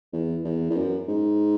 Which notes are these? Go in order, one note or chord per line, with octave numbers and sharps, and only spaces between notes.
E2
E2
E2
F#2
G#2